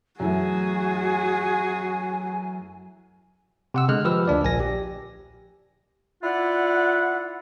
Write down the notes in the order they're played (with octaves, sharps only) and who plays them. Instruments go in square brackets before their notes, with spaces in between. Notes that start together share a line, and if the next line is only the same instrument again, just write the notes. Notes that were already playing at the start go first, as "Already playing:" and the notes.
[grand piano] F#2 E3 A3 [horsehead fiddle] F#4 G#4 [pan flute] G#5
[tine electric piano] C3 F#5 E6
D3 G#3 F6 F#6
F3 G4 B4 E6 F6
D2 D4 D5
A#1 G#5 A#6
G4
[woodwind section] E4 F4 D5 F#5